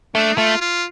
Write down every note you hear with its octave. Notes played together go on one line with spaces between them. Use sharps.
A3 D4
A3 F4
F4